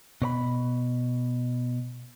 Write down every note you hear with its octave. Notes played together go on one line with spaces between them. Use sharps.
B2 C#5 B5